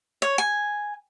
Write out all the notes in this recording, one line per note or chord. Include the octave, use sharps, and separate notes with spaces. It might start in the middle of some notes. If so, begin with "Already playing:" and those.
C#5
G#5